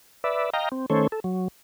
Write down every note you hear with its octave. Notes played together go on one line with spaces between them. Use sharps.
B4 D5 E5
D#5 F5 G5 A#5
C4
D#3 A3 C#4 A4 C5 C#5
A4
F#3